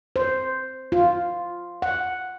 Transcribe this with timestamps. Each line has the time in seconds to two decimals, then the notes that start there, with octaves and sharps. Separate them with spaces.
0.16 C5
0.92 F4
1.82 F#5